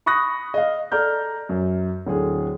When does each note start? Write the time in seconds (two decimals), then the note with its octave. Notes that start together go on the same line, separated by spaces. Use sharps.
0.06 B5 C#6 D#6 F#6 A#6
0.54 D#5 F5
0.92 A4 D5 A#5 F6 G6
1.49 F#2
2.06 D1 D3 G#4